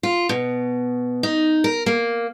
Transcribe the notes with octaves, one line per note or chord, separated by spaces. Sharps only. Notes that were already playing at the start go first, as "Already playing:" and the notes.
F4
B2
D#4
A#4
A#3